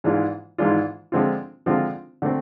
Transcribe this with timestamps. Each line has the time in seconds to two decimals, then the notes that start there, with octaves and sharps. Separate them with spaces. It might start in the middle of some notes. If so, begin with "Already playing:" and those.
0.04 G#2 E3 G#3 D4 F4
0.58 G#2 E3 G#3 D4 F4
1.12 D3 F3 G#3 C4 F4
1.66 D3 F3 G#3 C4 F4
2.22 D3 A3 C4